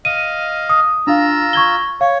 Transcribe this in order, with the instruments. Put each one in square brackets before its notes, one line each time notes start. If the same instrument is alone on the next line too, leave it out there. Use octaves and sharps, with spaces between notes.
[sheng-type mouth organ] D#5 F5 [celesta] D#7
[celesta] D#6
[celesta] D4 F5 [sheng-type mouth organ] F4 A#5 E6
[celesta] C#6 G#6 G7
[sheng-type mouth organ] C#5 [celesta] F5